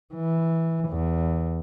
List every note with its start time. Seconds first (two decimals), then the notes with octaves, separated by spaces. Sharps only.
0.14 E3
0.89 E2